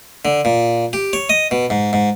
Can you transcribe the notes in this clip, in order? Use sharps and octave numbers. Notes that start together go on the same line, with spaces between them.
D3
A#2
G4
C#5
D#5
B2
G#2
G#2